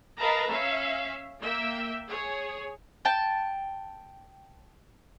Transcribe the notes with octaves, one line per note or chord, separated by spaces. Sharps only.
A#4 B4 D#5 F5 A5 A#5
C#4 E5 F5
A#3 E5 G5
G#4 C#5
G5 A5